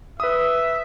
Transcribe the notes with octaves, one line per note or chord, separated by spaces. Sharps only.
B4 E5 D#6